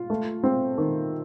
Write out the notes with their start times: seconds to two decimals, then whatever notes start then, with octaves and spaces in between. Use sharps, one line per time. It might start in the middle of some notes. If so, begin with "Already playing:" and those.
Already playing: F4
0.10 A3
0.43 C4
0.78 D#3